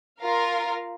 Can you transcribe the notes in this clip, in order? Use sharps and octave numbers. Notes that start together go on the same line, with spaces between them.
F4 A#4 F5